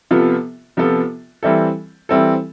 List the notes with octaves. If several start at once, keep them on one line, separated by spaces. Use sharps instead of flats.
C3 F3 B3 F4 A4
C3 F3 B3 F4 A4
E3 G3 C4 E4 A4
E3 G3 C4 E4 A4